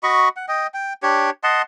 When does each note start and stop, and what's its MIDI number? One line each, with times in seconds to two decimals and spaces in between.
0.03 0.29 66
0.03 0.29 75
0.03 0.29 83
0.03 0.29 85
0.36 0.46 78
0.48 0.67 75
0.48 0.67 79
0.74 0.93 79
1.03 1.30 62
1.03 1.30 67
1.03 1.30 73
1.44 1.62 75
1.44 1.62 78
1.44 1.62 81
1.44 1.62 84